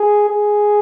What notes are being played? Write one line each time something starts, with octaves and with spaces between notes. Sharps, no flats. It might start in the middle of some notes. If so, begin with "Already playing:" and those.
Already playing: G#4
G#4